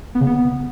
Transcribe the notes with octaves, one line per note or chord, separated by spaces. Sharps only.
B3
C#3
B3